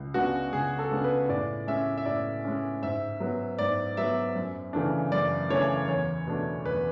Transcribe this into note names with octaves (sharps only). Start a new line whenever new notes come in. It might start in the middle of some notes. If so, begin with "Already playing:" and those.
Already playing: C#2
C#3 G#3 B3 D4 F#4
C#2 G#4
A4
C#3 G#3 B3 D4
B4
A2 D5
G#3 C#4 E5
E5
A2 D5
G#3 C#4
G#2 E5
F#3 B3
G#2 D5
F#3 B3 E5
F#2
C#3 E3 A3 D4
F#2 D5
C#3 E3 A3 D4 C#5
E2 C#5
B2 A3 D4
E2 B4